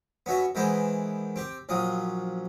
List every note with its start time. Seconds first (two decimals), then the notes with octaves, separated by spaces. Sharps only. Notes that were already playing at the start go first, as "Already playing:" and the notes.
0.26 B3 C#4 F#4 E5
0.55 D#3 E3 G#3 B3 C5
1.36 C4 G4
1.69 A#1 F3 F#3 D#6